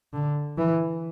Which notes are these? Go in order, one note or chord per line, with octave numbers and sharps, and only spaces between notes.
D3
E3